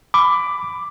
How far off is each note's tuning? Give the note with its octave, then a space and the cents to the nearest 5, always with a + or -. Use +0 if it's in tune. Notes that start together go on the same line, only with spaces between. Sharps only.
B5 +20 D6 +0